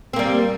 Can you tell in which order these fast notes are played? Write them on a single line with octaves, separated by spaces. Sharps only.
C4 A#3 G3